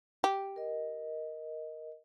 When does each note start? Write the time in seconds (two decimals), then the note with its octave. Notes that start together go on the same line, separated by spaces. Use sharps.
0.24 G4
0.56 A#4 D#5